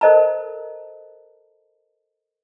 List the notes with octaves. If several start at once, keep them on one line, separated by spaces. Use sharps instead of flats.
A4 A#4 C5 D#5 A5 A#5